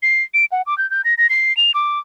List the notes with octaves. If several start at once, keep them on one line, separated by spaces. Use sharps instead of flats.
C7
D7
F#5
D6
G6
G6
A#6
A#6
C7
F7
D6